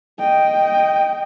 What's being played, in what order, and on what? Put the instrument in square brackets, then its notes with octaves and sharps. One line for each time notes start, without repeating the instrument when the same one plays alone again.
[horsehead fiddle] D#5 G5